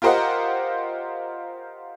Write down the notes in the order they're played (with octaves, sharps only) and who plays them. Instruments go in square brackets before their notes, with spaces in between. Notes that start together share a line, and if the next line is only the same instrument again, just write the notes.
[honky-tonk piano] F4 G4 A#4 C5 D#5 F#5